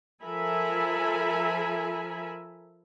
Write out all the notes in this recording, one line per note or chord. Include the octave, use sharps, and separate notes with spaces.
F3 A4 A#4 E5 G#5 B5